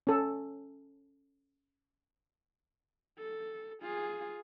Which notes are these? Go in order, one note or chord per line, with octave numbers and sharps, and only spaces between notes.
C#4 A4
A4
F4 G#4